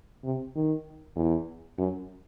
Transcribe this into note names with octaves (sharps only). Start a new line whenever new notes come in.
C3
D#3
E2
F#2